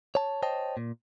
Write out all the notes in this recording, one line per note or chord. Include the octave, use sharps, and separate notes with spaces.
C#5 A5
C5 C#5 D#5 G5 A5
A#2